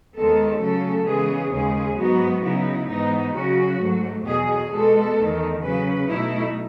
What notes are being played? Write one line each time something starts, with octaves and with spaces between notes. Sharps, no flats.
D#2 D#3 G#3 B3 A4
C#3 F#3 A3 C#4 A4
C#3 E3 G#3 B3 G#4
D#2 C#3 G#3 G#4
G#2 F#3 B3 D#4 F#4
C#3 F#3 B3 D#4 E4
G#2 E3 B3 D#4
C#3 F#3 C#4 F#4
G#2 F#3 A3
E2 B2 F#3 G#4
B2 G#3 B3 A4
E2 D#3 A3
C#3 F#3 C#4 B4
B2 F#3 A3 D#4 E4